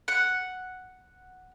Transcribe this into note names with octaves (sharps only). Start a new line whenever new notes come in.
F#5